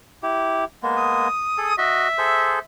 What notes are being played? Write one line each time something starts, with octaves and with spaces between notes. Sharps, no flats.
E4 G4
G#3 A#3 B3
D#6
G#4 A4
F#4 D#5 E5
G#4 A4 C5